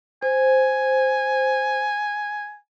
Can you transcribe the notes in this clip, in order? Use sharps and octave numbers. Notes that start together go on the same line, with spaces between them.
C5 G#5